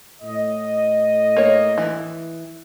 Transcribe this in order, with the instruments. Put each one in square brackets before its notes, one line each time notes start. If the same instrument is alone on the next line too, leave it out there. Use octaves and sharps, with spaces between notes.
[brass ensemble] A2 D#5
[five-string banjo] A#3 C#5
E3